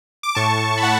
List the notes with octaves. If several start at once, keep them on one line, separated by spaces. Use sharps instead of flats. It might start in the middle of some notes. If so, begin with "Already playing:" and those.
D6
A2 A5 C#6
B5
A2 F#5 A5